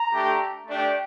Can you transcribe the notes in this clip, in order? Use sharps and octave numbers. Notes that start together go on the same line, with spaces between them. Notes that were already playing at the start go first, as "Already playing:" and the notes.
Already playing: A#5
A3 D4 G4
A3 D4 G4